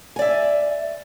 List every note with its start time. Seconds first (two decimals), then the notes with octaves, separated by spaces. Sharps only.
0.16 G#5
0.19 D5
0.22 E5